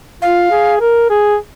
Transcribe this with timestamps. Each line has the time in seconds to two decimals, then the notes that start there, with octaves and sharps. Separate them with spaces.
0.22 F4 F5
0.51 G#4
0.80 A#4
1.10 G#4